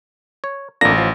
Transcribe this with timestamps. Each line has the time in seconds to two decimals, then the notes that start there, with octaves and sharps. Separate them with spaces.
0.44 C#5
0.81 A1 F2 A#3 D4 A#6
0.98 F3